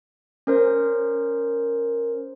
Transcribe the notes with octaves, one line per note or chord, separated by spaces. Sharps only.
C#4 A#4 C5